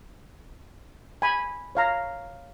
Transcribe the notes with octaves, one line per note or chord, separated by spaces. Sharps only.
G#5 B5
C#5 F5 A#5